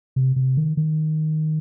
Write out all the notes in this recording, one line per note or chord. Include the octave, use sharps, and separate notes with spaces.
C3
C3
D#3
D#3